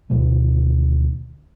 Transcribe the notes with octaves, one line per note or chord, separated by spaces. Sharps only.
D2 B2 D#3 A3